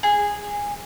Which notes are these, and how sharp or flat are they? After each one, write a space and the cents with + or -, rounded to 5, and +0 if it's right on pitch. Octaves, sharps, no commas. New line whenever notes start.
G#4 -15